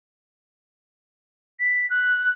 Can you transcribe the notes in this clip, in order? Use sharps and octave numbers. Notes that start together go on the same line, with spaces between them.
B6
F#6